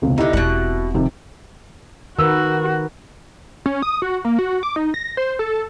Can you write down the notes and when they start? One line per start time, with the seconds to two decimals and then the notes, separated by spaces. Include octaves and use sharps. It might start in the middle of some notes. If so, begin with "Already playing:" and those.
0.02 E1 C#2 C3
0.18 D3 D#4 E4 G4 E5
0.33 E1 B2 C4 F#5
0.94 F2 C3 D#3
2.19 D#3 F#4 A#4 B4 E6
3.66 C#4
3.82 D#6
4.02 F#4
4.25 A#3
4.39 F#4
4.63 D6
4.76 D#4
4.94 A#6
5.17 C5
5.39 A4